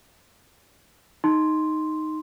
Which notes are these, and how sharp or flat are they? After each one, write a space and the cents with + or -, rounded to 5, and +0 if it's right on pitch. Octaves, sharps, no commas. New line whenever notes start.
D#4 +0 C6 +0